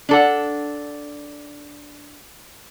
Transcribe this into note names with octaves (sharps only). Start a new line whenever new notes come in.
D4 A4 F#5